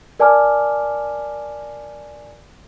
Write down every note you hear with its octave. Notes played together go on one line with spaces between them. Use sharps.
A#4 D5 G#5 A5 D6 F6